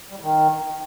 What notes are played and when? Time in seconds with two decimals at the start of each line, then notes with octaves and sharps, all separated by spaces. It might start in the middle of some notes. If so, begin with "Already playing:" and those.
0.09 G3
0.16 A2
0.22 D#3